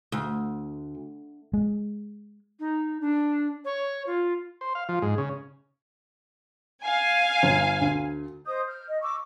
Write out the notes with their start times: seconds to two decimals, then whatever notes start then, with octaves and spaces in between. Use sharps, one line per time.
0.12 D2
1.53 G#3
2.59 D#4
3.01 D4
3.64 C#5
4.06 F4
4.61 C5
4.75 F5
4.89 F3
5.02 G#2
5.18 C#3
6.83 F5 G#5
7.43 G1
7.81 D2
8.46 C5 D#5 D#6 G6
8.67 F6 G6
8.88 D#5
9.01 C#6 D6 E6